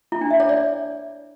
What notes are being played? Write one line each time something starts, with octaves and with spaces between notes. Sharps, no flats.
E4
D4
E5
C#5
D5